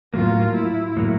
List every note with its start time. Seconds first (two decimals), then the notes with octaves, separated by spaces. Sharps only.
0.14 A2 F#3 A#3 F4
0.55 E4
0.97 A2 F#3 A#3